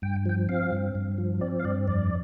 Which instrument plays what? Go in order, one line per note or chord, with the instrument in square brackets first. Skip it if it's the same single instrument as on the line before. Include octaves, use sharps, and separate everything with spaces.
[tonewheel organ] G2 G5
F3 G5
C4 F5
G2
G2
F3
C4 D5
F5
G2 D5
F2 D5